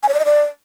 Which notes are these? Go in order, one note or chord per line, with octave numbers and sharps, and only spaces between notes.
G#5
C#5
D5
D#5
D5